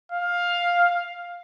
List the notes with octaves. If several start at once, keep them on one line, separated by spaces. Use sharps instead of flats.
F5